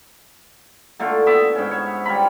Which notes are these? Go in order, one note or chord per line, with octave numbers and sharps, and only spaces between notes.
D3 A3 A#3 F4
B3 E5 D6
G#2 C#4
C#5
G3 F4 A#5 B5